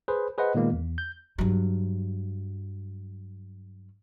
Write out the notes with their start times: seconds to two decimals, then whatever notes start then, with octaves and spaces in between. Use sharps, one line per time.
0.08 G#4 B4 C5
0.38 G#4 B4 C5 D#5 F#5
0.55 A#2 D#3 G#3 A#3 B3
0.73 E2
0.98 G6
1.38 G2 F#3